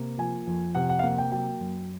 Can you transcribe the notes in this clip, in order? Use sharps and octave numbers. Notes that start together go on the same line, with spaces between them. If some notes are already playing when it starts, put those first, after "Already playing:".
Already playing: C3 A#3
F3 G#5
F2
C3 F#5
F#5
F5
A#3 F#5
G5
F#3 G5
F#2